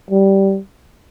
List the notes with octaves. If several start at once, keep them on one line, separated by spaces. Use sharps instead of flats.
G3